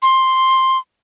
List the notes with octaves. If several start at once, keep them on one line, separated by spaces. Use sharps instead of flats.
C6